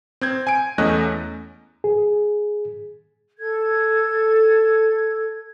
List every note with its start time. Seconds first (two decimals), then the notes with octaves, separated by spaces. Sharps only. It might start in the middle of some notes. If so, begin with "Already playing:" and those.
0.21 C4 G6 G#6
0.47 G#5 D7
0.78 E2 A3 C#4 D#5 F#6
1.84 G#4
3.38 A4 G#6